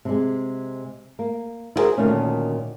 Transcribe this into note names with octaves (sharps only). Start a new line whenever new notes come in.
C3 G#3
A#3
E4 F#4 G#4 A#4 C5 E5
D2 A#2 D#3 A3 C#4